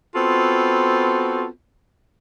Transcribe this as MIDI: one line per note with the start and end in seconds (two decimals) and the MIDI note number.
0.16 1.47 59
0.16 1.47 60
0.16 1.47 65
0.16 1.47 66
0.16 1.47 69